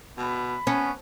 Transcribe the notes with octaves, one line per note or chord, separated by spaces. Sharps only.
B2 B5
B3 C#4